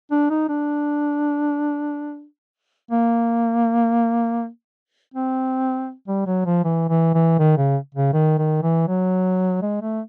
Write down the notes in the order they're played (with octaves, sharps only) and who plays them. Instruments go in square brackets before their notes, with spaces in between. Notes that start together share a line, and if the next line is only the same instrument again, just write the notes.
[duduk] D4
D#4
D4
A#3
C4
G3
F#3
F3
E3
E3
E3
D#3
C#3
C#3
D#3
D#3
E3
F#3
G#3
A3